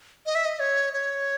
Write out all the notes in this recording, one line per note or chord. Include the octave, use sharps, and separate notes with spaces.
D#5
E5
D#5
C#5
C#5